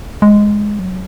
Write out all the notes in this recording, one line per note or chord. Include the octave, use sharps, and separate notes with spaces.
G#3
F#3